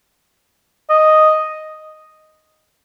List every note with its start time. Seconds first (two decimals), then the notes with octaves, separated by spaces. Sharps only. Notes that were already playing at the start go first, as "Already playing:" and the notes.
0.90 D#5